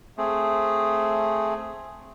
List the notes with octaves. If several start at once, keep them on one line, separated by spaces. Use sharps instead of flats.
A3 C4 G#4